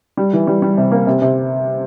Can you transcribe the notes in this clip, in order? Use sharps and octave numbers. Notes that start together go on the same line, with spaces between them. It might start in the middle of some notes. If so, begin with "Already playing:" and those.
G3
E3
G3
G3
C3
A#3
C3
C3